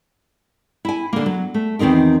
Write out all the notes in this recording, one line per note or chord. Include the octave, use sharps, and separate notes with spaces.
E4 G#5
D3 A#3
F#3
A3
E2 D#3 C4 D#4 A#4